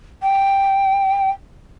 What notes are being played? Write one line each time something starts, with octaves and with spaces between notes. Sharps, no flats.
G5